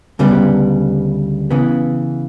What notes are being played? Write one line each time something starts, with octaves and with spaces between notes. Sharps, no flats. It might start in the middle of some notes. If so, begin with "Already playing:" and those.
D2 C#3 G3 B3
C#3 E3 B3